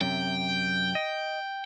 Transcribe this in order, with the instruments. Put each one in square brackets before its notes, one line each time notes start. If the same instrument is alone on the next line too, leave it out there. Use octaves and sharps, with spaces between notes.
[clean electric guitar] F#2 C3 [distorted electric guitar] G5
[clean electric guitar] D#5